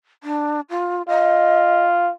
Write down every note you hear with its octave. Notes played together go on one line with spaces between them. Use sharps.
D4
F4
F4 D#5